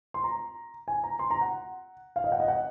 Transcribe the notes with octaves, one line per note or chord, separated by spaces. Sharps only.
C6
A#5
G#5
A#5
C6
A#5
F#5
F5
D#5
F#5
D#5
F#5